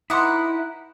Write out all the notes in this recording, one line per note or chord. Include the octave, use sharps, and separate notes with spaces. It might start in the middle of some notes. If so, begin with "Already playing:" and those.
D#4 E4 B4 F#5 C6 D6 D#6